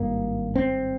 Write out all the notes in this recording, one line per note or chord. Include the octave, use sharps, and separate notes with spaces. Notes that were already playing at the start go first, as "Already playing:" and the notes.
Already playing: G#1 G2 A#3
C4